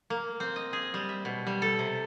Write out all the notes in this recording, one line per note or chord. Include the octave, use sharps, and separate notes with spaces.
A#3
C4
D#5
G#4
G3
E5
B2
G3
A4
C3